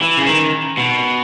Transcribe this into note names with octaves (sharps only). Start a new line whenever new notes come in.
E3
C#3
D#3
B2